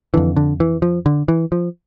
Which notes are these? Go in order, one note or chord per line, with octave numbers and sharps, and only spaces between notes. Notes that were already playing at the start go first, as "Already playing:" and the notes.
F2 D3 E3
D3
E3
F3
D3
E3
F3